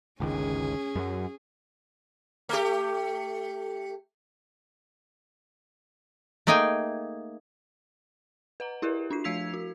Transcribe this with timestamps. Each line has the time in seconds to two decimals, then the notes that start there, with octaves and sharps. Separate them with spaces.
0.20 G1 C#2 D#3 C#4 G#4
0.96 F#2 F#3
2.49 A3 G4
6.47 A3 A#3 D#4 G#4 G5 G#5
8.60 B4 F#5 A#5
8.82 E4 G4 A#4 B4 E5
9.11 D4 F4 C7
9.24 F3 F5 E6 G#6 B6 F7
9.54 F#4